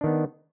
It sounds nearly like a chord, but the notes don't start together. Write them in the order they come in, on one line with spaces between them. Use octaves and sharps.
D4 D#3 B3